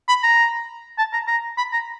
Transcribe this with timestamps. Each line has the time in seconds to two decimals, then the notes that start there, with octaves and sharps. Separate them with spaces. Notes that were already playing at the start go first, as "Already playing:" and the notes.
0.08 B5
0.23 A#5
0.98 A5
1.13 A#5
1.27 A#5
1.58 B5
1.73 A#5